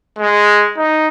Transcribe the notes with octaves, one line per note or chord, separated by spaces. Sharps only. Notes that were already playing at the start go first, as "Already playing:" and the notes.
G#3
D#4